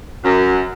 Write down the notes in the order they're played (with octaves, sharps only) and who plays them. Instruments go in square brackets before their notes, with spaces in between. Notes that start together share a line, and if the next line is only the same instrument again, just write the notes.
[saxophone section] F#2